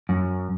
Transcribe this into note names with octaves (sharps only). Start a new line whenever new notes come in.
F#2